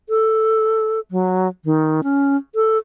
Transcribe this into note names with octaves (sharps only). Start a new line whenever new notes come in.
A4
F#3
D#3
C#4
A4